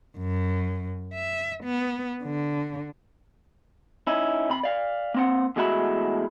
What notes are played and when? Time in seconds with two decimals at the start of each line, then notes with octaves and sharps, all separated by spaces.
0.18 F#2
1.14 E5
1.64 B3
2.23 D3
4.07 C#4 D#4 E4
4.50 C3 B5
4.63 D5 F5
5.14 A#3 C4 F#5
5.56 E2 A2 G#3 F#4 E5 B5